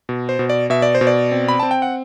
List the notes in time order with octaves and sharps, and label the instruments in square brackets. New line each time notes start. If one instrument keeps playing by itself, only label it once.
[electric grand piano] B2
C5
B2
D5
B2 E5
D5
C5
B2
D5
C4
B5
C4 A5
G5
F#5